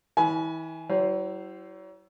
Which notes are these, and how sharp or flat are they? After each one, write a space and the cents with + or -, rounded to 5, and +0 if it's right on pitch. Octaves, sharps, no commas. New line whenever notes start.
E3 -35 G#5 +25 B5 +0
F#3 +40 E4 +0 C5 +0